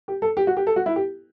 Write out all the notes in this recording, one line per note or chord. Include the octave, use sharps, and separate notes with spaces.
G4
A4
G4
F#4
G4
A4
F#4
E4
G4